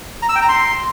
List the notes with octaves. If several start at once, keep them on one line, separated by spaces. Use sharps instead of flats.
A#5
E6
G5
A#5
C6